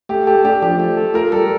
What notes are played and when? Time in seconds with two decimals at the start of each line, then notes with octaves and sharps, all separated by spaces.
0.09 A3 G4
0.27 G4 A4
0.45 D4 G4
0.62 F3 G4
0.80 A3
0.97 A4
1.14 F4 A#4
1.32 G3 A4